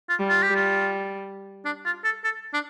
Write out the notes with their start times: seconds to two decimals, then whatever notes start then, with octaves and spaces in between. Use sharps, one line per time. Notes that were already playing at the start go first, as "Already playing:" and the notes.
0.09 F4
0.19 G3
0.29 F4
0.43 G4
0.49 G3
0.56 F4
1.65 D4
1.85 F4
2.04 A4
2.24 A4
2.53 D4